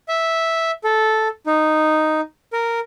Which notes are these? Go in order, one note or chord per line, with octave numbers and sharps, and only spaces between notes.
E5
A4
D#4
A#4